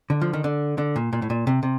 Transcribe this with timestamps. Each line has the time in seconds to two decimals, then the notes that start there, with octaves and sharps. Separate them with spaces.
0.10 D3
0.21 F3
0.33 D#3
0.44 D3
0.78 D3
0.96 A#2
1.13 A#2
1.22 A2
1.30 A#2
1.47 C3
1.63 C3